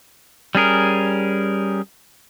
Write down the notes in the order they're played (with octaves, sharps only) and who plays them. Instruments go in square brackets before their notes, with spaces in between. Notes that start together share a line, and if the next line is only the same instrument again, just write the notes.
[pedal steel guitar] G3 C#4 G#4 A#4